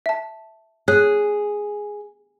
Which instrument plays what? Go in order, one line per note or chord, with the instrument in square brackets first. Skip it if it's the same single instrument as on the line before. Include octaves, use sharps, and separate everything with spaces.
[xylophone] E5 A5
[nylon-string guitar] G#4 [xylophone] C#5 F#6